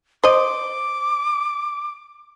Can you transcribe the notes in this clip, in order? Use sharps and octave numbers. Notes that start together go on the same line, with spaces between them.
C5 D#5 D6